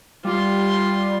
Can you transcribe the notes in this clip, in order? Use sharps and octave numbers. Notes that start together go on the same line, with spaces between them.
G3 F4 C6